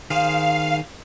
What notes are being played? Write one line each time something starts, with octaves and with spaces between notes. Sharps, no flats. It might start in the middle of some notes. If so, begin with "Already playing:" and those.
D#3 G#4 C5 F5